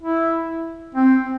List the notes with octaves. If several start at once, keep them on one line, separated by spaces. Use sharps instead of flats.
E4
C4